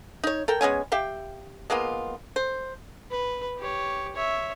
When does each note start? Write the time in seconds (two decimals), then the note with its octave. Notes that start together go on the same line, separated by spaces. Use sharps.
0.24 D#4 C#5
0.48 A4 A#4 G5
0.61 G#3 B3 C#4 G#5
0.92 G4 E5 F5 G5
1.70 G#3 A#3 B3 F4
2.36 C5
3.11 B4
3.58 G4 C#5
4.15 C#5 E5